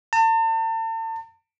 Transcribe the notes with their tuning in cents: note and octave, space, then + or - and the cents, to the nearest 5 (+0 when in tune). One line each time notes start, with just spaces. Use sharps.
A5 +40